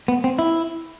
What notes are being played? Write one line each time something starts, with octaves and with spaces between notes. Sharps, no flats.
B3
C4
E4